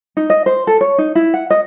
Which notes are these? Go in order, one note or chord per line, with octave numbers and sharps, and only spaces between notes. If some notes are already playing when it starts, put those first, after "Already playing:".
D#4
D#5
C5
A4
C#5
D#4
E4
F#5
D#5